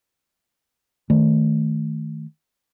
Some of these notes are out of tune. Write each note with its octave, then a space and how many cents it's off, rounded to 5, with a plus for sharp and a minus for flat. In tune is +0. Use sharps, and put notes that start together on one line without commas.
D#3 +5 A3 +0